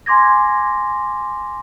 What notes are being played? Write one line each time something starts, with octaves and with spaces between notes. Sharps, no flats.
G#5 C6 D6 G#6 A#6